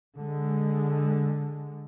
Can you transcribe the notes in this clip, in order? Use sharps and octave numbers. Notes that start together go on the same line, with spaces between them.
D3 G#3